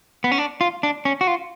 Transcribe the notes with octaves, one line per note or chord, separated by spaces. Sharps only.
B3
C#4
D4
F4
D4
C#4
F#4
F4